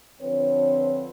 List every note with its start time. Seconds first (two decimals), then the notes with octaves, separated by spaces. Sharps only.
0.21 D3 F3 C4 B4 C#5